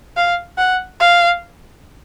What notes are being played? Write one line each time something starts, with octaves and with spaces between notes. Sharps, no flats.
F5
F#5
F5